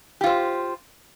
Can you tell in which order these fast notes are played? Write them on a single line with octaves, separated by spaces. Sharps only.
G4 F4 C5